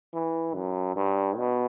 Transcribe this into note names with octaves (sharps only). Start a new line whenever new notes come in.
E3
F#2
G2
B2